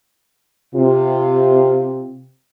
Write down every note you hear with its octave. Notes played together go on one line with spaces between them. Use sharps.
C3 F4